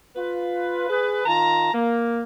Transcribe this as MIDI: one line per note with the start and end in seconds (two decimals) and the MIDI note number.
0.16 0.89 65
0.16 0.89 71
0.90 1.21 68
0.90 1.21 71
1.26 1.71 51
1.26 1.71 65
1.26 1.71 81
1.26 1.71 82
1.73 2.23 58